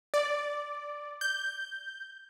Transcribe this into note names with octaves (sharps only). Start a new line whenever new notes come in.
D5
G6